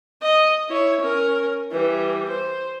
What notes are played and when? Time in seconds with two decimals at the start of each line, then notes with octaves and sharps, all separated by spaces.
0.22 D#5
0.69 E4 C#5
1.00 C#4 A#4
1.72 E3 G3
2.29 C5